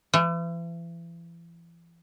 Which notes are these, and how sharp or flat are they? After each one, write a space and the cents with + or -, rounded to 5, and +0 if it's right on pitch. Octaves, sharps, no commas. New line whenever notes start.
E3 +40